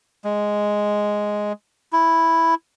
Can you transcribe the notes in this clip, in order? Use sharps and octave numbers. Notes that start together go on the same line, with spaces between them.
G#3
E4